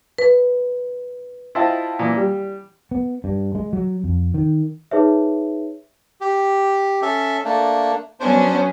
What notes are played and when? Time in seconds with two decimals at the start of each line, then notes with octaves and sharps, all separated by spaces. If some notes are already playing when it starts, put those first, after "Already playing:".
0.18 B4
1.55 E4 F4 C5 D#5 G5 A5
1.99 A#2 E3
2.17 G3
2.91 B3
3.24 G2
3.55 G#3
3.73 F#3
4.04 F2
4.34 D#3
4.91 D#4 G#4 B4 C#5 E5
6.21 G4
7.02 C#4 A4 E5
7.45 A3 A#3 D4
8.20 F#3 B3 C#4 D4 C5